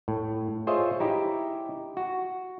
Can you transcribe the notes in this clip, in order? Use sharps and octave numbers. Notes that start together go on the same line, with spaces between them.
A2
F4 G#4 C5 C#5 D#5 E5
D#4 E4 G4
F#4